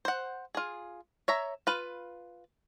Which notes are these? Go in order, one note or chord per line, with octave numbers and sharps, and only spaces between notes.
C5 F#5
F4 G#4
C#5 E5 A#5
F4 B4